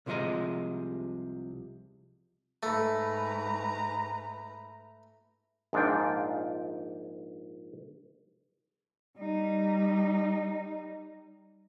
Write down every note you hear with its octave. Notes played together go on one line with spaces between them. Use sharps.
C2 C3 F3 G#3 D#5 A#5
G#2 A3 B4 A#5
A#1 G#2 D4 F4 G5
G3 D#4